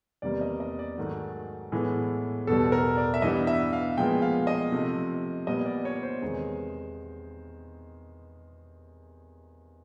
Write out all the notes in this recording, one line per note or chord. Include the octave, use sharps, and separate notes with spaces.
E2 C3 D#3 G3 A#3 D5
D#5
D#5
D5
G#2 D#3 F#3 A3
A2 E3 G#3 B3
E2 B2 G3 A4
A#4
D5
E5
G2 E3 G3 B3 D#5
E5
F5
A#2 F3 G#3 B3 G5
F5
D#5
C3 F3 A3
A#2 G3 B3 D#5
D5
C#5
C5
E2 C3 D#3 G#3